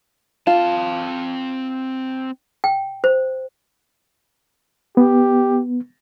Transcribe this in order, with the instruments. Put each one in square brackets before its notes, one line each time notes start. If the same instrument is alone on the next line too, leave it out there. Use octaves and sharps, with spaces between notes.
[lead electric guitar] C4 A5 [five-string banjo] F4
[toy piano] G5
C5
[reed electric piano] B3 [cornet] G4